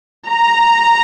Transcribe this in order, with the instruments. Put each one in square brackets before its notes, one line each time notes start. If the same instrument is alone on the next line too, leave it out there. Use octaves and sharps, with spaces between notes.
[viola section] A#5